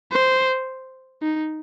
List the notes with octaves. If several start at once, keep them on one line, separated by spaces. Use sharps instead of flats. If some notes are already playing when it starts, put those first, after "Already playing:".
C5
D#4